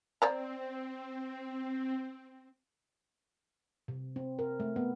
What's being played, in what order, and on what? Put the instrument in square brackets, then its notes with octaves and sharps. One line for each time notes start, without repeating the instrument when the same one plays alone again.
[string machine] C4 [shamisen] C5 D5 A#5
[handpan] C3
C4
A#4
A3
B3